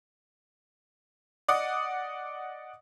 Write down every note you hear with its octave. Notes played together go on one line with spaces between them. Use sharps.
D5 D#5 F#5 D6 D#6